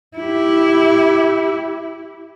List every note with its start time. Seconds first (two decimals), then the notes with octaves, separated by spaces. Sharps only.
0.18 E4 G4